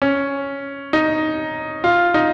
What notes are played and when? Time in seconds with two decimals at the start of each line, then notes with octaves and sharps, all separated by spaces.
0.02 C#4
0.93 D#4
1.84 F4
2.14 D#4